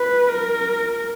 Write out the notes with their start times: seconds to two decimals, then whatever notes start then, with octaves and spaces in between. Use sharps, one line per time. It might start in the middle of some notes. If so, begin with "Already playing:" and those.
Already playing: B4
0.28 A#4